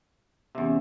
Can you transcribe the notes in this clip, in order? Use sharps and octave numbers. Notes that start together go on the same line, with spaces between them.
E2 C3 C#4 E5